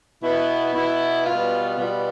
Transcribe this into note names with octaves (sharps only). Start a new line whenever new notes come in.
B2 B3 E4
B2 B3 E4
B2 G3 B3 F4
B2 G3 B3 F4